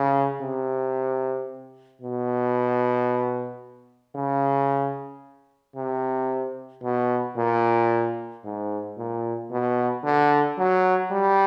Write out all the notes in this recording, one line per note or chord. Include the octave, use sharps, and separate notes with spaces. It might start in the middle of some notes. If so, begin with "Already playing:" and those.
Already playing: C#3
C3
B2
C#3
C3
B2
A#2
G#2
A#2
B2
D3
F#3
G3